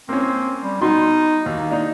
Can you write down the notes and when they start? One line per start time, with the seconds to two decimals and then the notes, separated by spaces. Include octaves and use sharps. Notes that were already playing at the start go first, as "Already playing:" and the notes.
0.09 A#3 C4 C#4
0.62 G3
0.81 B2 D#4 C6
1.46 D#2 A#3
1.71 D4 D#4